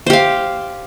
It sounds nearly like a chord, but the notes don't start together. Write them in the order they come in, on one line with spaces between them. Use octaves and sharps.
C5 G4 F5